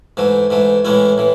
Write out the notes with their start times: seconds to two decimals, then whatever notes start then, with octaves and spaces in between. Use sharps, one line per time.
0.17 G#2 E3 A3
0.50 G#2 E3 A3
0.85 A2 E3 G#3 C#4 E4
1.18 A2 E3